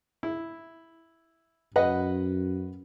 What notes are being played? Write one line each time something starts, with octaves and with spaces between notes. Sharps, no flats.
E4
F#2 B4 D#5 F#5